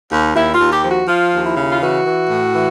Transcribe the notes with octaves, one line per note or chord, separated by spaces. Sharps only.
D#2
D#2 E4
F4
D#2
G4
F3
F#4
F3 F4
D#2
E4
C#3
F4
E3 F#4
E3
A2
E3